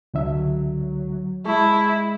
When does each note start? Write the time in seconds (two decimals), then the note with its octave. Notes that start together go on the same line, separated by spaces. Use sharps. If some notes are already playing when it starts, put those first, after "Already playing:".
0.14 C#2 D3 F#3 E5
1.45 G#3 E4 G#4 A5 C#6